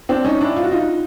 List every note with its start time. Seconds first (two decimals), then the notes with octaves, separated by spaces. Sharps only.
0.09 C4 D4
0.25 C#4 D#4
0.41 D4 E4
0.56 F4
0.64 F#4
0.71 D#4 F4